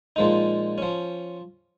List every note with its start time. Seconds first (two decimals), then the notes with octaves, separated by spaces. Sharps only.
0.16 A#2 F3 G#3 D#4
0.78 F3 C#4